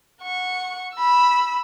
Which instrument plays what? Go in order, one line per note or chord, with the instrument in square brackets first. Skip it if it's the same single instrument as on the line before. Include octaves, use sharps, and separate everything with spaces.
[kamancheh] F#5 C#6
B5 E6